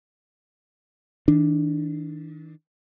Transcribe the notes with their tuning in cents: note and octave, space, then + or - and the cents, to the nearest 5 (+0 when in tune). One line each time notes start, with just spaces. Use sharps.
D#3 +45 D4 +0